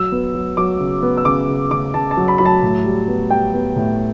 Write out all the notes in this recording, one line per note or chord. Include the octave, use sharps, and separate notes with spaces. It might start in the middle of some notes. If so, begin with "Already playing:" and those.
Already playing: F#3 E6
B3
F#3
F#3 D6
C#3
B3
E6
C#3 D6
C#3
C#3 D6
C#3 A5
A5
F#3
B5
F#3 B5
A5
A2
G3
B3
G3 G5
B3
A2